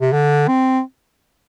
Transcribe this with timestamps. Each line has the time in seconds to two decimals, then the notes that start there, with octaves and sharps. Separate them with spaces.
0.01 C3
0.12 D3
0.48 C4